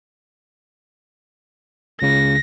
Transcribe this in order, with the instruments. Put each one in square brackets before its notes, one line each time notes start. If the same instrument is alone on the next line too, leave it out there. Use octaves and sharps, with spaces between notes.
[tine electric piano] C#2 C#3 [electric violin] A#6